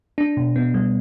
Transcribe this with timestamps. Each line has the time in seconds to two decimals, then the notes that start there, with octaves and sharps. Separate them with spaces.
0.18 D4
0.37 B2
0.56 B3
0.74 G3